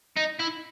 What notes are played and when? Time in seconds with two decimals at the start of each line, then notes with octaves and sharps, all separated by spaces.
0.17 D#4
0.40 E4